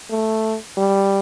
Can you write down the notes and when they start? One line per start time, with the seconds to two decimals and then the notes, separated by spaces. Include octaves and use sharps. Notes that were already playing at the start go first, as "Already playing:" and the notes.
0.10 A3
0.77 G3